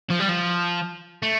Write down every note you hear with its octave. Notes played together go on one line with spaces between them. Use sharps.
F3
G3
F3
A3